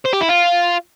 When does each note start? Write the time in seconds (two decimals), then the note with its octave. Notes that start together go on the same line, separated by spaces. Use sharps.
0.05 C5
0.13 G4
0.21 E4
0.29 F4